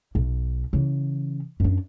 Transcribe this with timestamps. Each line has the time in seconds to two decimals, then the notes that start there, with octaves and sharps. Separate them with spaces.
0.15 B1
0.73 C#3 E3
1.60 F#2 D4